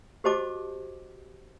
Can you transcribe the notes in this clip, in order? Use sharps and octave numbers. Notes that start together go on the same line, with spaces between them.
F#4 G4 C5 D#5 A5 D6